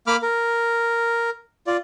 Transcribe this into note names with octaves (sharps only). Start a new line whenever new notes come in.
A#3 B5 D6 F6
A#4
F4 D5